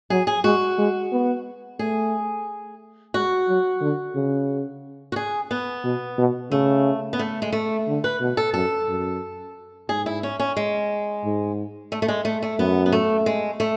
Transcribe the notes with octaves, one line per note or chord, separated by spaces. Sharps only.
F#3 G#4
G#4
G#3 F#4
G#3
B3
A3 G#4
G#3 F#4
F#3
D3
C#3
F#4
G#4
B3
B2
B2
C#3 A3
B3
A3
G#3
A3
D3
B4
B2
A4
F#2 A4
F#2
G#2 G#4
E4
C#4
C#4
G#3
G#2
A3
A3
G#3
A3
A3
F#2 B3
B3
A3
G#3
A3